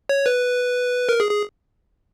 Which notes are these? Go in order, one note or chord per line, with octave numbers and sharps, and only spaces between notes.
C#5
B4
A#4
G#4
G#4